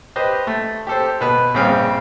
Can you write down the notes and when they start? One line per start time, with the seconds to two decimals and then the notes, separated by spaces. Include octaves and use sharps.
0.16 G4 B4 C5 D#5
0.47 A3
0.87 G4 A4 C5
1.21 B2 B4 B5
1.54 A#1 G2 C#3 C4 F5 F6